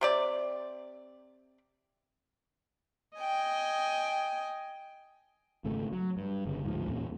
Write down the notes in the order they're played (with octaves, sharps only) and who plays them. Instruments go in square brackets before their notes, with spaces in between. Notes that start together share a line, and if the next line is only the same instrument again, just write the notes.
[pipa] C3 C4 D5
[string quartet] D#5 G5 G#5
[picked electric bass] G#1 C#3 A3
F#3
G2
G1 C#3
D2 G#2 F3
E2 A#2 C#4